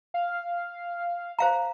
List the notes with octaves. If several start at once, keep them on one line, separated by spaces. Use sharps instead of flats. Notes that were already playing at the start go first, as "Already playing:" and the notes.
F5
C5 F5 A#5